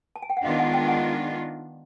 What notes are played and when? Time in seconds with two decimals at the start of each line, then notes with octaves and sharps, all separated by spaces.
0.16 A5
0.22 G#5
0.30 G5
0.37 F#5
0.44 D#3 G#3 B3 D4 F4 D#5 F5
0.59 F#5 G#5
0.74 G5 A5
0.88 F#5 G#5